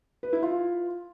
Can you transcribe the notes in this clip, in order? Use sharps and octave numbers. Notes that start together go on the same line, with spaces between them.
B4
E4
F4